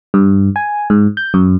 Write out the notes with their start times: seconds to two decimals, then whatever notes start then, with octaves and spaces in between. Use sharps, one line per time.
0.14 G2
0.56 G#5
0.90 G#2
1.17 G6
1.34 F#2